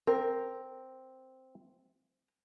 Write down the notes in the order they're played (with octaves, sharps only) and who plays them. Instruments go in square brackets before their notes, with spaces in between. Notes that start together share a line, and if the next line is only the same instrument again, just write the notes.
[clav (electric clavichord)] C4 [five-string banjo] A#4